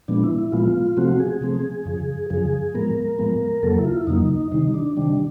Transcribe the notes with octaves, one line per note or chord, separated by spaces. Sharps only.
A#2 F3 G#3 B3 D4
E4
E4
A#2 F3 G#3 B3 F4
C3 F3 A3 C4 F#4
G#4
C3 F3 A3 C4
F#2 C#3 F3
F#2 C#3 F3 G#4
A2 F3 G#3 B3 A#4
A2 F3 G#3 B3
F2 C#3 F#3 A#3 A4
E4
F4
E4
F2 C#3 F#3 A#3 D#4
C3 D#3 G3 D#4
D4
C3 D#3 G3 D4